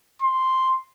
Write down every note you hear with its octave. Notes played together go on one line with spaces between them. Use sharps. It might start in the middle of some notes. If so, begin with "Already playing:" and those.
C6